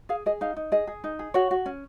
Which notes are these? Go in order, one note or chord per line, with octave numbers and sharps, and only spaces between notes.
G#4 F5
G#4 D#5
D#4 F5
D#4
G#4 D#5
G#4
D#4
G#4
F#4 C#5
F#4
C#4